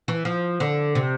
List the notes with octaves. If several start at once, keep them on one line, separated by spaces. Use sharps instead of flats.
E3
F3
D3
C3